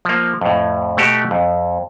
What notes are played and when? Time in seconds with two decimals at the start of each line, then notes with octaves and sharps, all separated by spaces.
0.05 F3 A#3
0.41 F2 A2
0.97 B2 A3 F#4 G4
1.31 F2